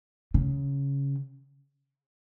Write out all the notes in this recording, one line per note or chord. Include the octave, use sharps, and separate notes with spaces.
C#3